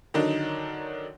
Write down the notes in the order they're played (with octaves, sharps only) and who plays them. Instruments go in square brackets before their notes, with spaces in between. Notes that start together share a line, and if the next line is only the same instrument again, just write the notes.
[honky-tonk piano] D3 D#3 F#3 D4 D#4